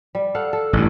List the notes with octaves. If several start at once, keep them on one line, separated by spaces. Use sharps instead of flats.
G3
A4 F5 F#5
A4
A1 G2